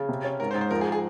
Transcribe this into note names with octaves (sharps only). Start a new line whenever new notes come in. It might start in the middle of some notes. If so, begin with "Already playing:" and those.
Already playing: C#3
C3
C#4
G#2 A#4
C5
G#2
C5
F2 A#4
G#4
G#4